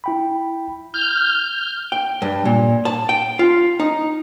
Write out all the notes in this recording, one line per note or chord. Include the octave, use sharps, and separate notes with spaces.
E4 G5 B5
F6 G6
G5
G2
A#2
A5
G5
F4
D#4